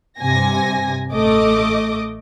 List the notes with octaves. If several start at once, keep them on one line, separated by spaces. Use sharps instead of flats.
G2 C3 G#5 A#6
A1 A3 D#5 D6